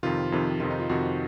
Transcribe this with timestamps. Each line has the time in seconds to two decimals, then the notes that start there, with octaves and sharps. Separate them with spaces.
0.03 F2 C3 D#3 F4
0.32 F2 C3 D#3
0.60 F2 C3 D#3 F4
0.70 D#4
0.80 F4
0.89 F2 C3 D#3 F#4